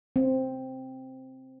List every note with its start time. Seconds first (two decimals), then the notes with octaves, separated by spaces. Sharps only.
0.16 C4